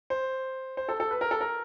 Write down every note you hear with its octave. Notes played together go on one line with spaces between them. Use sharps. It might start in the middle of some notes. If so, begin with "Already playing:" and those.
C5
C5
A4
A4
B4
A#4
A4
A#4